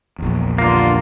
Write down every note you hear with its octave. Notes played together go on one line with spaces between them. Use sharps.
A#1 E2
G2 D3 A#3 F4